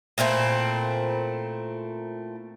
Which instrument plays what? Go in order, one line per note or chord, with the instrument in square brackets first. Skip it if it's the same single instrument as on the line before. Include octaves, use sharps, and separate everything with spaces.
[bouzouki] A#2 A3 C4 E4